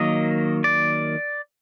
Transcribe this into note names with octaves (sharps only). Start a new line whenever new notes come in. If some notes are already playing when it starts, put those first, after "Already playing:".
Already playing: D#3 F#3 A#3 D#5
D5